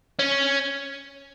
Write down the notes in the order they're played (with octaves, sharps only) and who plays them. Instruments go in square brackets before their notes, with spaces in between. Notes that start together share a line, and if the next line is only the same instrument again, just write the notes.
[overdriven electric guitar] C#4